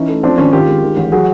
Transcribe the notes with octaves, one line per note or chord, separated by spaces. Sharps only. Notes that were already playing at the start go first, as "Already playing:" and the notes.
Already playing: E3 C#4 D#4
A3
F3 C4 D4
G#1 C#4
D#3 F4 G4
G#3
D#3
A1
F#3 F#4 G#4